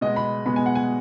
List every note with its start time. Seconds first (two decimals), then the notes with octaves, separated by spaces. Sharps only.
0.01 B2 G#3 B3 D#5
0.16 B5
0.45 B2 G#3 B3 B5
0.56 G#5
0.66 F#5
0.75 G#5